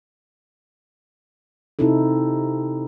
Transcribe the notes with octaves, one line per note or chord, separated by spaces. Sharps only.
C3 C4 D#4 E4 A4